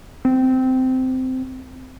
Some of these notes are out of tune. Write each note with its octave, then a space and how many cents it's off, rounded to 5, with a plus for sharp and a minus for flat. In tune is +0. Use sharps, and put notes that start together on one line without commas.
C4 -15